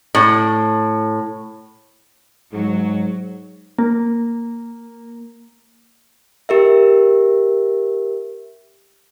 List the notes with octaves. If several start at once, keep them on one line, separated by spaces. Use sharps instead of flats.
A2
G#2 F#3
A#3
G4 A#4 E5